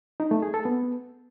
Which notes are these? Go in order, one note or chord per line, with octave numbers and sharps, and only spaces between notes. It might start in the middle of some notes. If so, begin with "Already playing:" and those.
D#4
A3
G#4
A4
B3